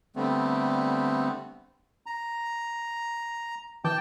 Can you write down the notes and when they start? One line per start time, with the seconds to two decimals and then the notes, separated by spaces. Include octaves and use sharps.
0.16 D3 G3 A3 B3 C4
2.06 A#5
3.84 E3 G5 A5 D6 G6